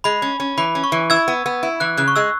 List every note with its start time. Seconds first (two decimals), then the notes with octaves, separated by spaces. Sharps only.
0.04 G#3 B5
0.22 C#4
0.40 C#4
0.58 E3 B5
0.75 C#4
0.84 C#6
0.92 E3
1.10 E4 E6 G#6
1.28 B3
1.46 B3
1.63 E4
1.80 E3 F#6
1.97 C#3 F#6
2.08 C#6
2.16 G#3 E6